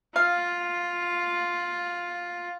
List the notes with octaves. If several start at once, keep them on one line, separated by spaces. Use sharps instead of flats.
F4 F5